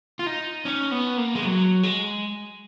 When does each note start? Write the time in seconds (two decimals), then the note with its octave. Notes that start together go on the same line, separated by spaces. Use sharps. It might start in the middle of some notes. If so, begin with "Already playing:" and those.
0.19 F4
0.26 D#4
0.65 C#4
0.91 B3
1.18 A#3
1.35 G#3
1.44 F#3
1.83 G#3